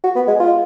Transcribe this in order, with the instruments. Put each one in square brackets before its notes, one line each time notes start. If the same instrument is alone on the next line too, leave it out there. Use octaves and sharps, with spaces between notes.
[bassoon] F#4
B3
G#3
F4